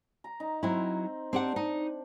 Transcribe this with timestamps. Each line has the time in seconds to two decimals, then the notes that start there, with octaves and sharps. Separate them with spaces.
0.24 A#5
0.40 D#4
0.63 F#3 C4 E4
1.33 C4 D4 G4 F#5
1.56 D#4